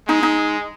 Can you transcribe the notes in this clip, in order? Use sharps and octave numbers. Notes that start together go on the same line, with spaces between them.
G#3 D#4
D#4